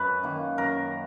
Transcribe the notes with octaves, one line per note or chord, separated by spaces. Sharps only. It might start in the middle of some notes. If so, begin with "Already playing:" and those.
Already playing: F#2 B4
D#3 A#3
F#2 A#4